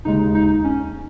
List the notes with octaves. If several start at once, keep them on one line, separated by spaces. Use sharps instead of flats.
D#2 C#3 G#3 D#4
D#4
C#4